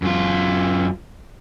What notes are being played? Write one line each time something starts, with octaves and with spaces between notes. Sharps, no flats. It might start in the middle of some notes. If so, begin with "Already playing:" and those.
F#2 F4